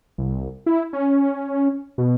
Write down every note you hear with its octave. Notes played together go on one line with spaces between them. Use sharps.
C2
E4
C#4
B2